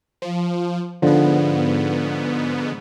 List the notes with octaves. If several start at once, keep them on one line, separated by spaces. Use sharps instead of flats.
F3
G#2 D3 F3 B3